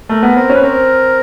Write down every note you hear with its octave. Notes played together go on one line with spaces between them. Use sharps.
A3 A#4
B3
C4 A#4
C#4 B4
C4 A#4